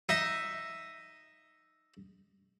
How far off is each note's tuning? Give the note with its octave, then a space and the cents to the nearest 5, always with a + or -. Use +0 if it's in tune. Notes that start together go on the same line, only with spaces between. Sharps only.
D#4 +0 E5 +0